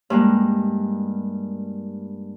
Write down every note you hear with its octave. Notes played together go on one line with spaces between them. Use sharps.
G2 G#3 A#3